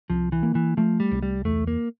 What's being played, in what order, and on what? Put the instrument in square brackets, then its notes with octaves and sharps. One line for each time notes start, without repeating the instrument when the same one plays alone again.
[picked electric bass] C2 [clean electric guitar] F3
[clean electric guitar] E3
[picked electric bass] A#3
[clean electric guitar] E3
[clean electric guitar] F3 [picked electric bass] A3
[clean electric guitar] G3
[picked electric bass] C2
[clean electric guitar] G3
[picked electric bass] E2 [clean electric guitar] A3
[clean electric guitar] A#3